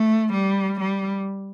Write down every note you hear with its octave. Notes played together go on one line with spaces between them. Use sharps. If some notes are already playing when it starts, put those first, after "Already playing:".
Already playing: A3
G3
G3